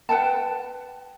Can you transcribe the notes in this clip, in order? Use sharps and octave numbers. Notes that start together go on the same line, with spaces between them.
B4 F#5 G5 A5